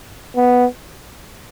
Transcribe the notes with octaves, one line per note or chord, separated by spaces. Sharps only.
B3